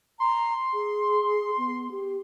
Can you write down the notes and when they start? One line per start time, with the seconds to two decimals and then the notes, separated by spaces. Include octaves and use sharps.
0.20 A#5 C6
0.73 G#4
1.58 B3
1.91 G4